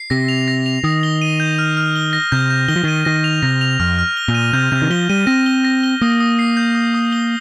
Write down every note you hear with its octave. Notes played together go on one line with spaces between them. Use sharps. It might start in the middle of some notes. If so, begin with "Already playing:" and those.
Already playing: C7
C3 A#6
F7
A#6
F7
D#3 D#6
G7
D#7
G6
F6
F6
G7
A#6
C3 G6
G6
D#3 G7
F3
D#3 D#7
D#3 A#6
F7
C3 A#6
F7
F2 F6
F6
G7
A#2
D#7
C3 G6
C3 G6
D#3
F3 G7
G3 D#7
C4 A#6
G7
A#6
G7
A#3 D#6
D#6
C7
G6
D#6
D#6
G7